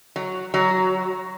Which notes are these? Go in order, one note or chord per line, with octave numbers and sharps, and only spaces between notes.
F#3
F#3